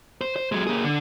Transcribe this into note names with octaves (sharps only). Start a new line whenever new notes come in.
C5
C5
F#3 G#3
A#3 G#4
D3